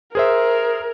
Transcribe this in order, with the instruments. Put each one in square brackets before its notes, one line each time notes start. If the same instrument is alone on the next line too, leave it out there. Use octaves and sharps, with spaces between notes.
[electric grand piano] G#4 C5 E5 [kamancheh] A#4